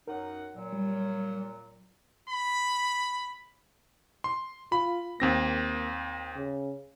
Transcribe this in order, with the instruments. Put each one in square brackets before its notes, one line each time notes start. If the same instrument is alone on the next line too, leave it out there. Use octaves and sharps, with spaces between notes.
[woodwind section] F#2 D#4 F#5 [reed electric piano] A#4
[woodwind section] A#2 F#3
[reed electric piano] G3
[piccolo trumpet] B5
[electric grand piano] C6
[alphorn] F4 [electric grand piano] B5
[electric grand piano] D#2 C4 A#6 [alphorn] A#3
[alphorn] C#3